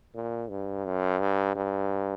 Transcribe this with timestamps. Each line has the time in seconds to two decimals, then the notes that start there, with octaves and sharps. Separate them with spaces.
0.15 A#2
0.50 G2
0.86 F#2
1.21 G2
1.56 G2